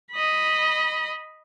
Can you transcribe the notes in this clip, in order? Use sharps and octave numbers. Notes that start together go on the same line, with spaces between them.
D#5 B5